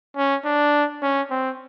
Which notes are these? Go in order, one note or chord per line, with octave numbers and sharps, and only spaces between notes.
C#4
D4
C#4
C4